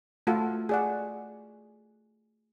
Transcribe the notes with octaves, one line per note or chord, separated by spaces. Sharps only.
A3 F4 F#4 A4 F#5
G#4 D5 F#5